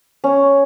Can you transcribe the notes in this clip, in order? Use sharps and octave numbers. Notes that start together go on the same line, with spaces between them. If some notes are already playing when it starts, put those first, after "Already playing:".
C#4